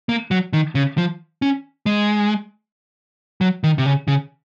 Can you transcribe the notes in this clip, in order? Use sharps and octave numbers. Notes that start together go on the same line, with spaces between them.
A#3
F#3
D#3
C#3
F3
C#4
G#3
F#3
D#3
C3
C#3
C#3